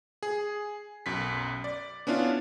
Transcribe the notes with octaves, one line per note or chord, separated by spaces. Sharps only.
G#4
B1 F#2 B6
D5
B3 C#4 D4 E4 F4